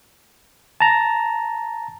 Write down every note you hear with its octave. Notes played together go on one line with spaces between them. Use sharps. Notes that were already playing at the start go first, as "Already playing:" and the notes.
A5 A#5